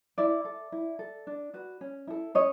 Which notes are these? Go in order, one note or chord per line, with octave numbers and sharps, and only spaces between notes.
E4 D5 E5
A4
E4
A4
D4
F#4 B4
C#4
E4 A4
C#4 C#5 D#5